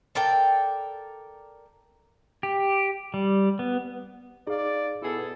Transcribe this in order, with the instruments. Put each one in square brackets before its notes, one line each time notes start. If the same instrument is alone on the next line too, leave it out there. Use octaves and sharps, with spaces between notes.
[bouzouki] A4 A#4 D5 G5
[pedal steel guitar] G4
G3
B3
[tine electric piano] D#4 F5 [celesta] G#4 [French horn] D5
[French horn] B2 [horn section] B3 G#4 A4 [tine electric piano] E4